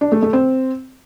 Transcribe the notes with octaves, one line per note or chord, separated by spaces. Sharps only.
D4
A3
A3
C4